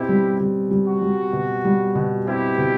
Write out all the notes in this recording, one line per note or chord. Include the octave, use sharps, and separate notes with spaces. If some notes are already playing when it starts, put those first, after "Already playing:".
Already playing: B2 C4 E4 G4
G3
G3
G3
F#4
G3
B2
G3
B2
C4 E4 G4
B2